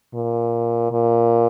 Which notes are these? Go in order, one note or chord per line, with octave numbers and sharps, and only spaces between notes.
A#2
A#2